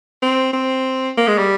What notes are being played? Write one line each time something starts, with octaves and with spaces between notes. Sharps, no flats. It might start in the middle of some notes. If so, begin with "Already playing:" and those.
C4
C4
A#3
G#3
G3